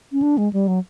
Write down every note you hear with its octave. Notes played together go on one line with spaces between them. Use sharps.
C#4
D4
G#3
G3
F#3